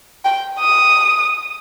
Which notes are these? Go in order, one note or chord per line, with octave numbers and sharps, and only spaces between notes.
G5
D#6